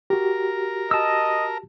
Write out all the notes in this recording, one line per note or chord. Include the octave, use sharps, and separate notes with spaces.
F#4 G4 A#4
D#5 A5 E6